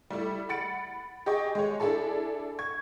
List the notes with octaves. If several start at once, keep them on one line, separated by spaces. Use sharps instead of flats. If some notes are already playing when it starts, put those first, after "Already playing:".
G3 A3 E4
F#5 B5 A6 C#7 D7
G4 G#4 D#5 G5 C#6
G#3 C#5
D4 E4 G#4 A4 A5
C#6 G#6